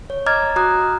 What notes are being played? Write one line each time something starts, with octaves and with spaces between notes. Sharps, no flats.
C#5
D#5 A#5 D6 F6 G#6 A6
F#4 A#5 D6 D#6 F#6